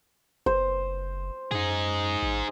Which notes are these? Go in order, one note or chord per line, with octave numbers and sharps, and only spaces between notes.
F#1 C5
F#2 D#4 G#4
A1